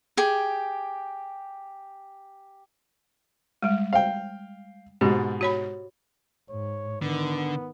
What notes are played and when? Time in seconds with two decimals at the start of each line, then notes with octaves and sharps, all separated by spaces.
0.17 G4 G#4
3.63 G3 G#3
3.93 F5 G5
5.01 G#2 B2 G4
5.41 F#4 C#5 B5
6.50 G#2 C#5
7.02 D3 D#3 B3